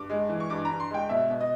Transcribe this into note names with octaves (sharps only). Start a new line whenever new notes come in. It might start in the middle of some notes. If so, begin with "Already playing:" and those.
Already playing: G2 D6
G#3
E3
C#6
G2 D6
G2 A#5
C6
G#3 G5
B2 E5
B2
D#5